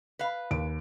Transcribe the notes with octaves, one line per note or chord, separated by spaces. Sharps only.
B4 F5
D#2 D7